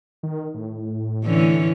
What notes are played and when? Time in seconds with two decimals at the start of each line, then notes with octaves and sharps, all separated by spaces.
0.23 D#3
0.54 A2
1.24 D3 E3 C#4